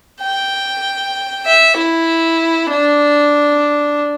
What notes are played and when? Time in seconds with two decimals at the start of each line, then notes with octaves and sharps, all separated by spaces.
0.21 G5
1.46 E5
1.77 E4
2.70 D4